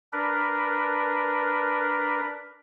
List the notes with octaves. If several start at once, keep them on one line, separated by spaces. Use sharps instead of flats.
D4 A#4 B4